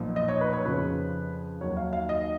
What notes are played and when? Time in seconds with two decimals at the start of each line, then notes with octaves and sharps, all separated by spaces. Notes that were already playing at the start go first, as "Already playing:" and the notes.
Already playing: B1 A#2 F3
0.16 D#5
0.28 C#5
0.41 B4
0.53 C#5
0.65 F2 C#3 F3 B4
1.61 D#2 D#3 F#3 C#5
1.77 F5
1.93 F5
2.09 D#5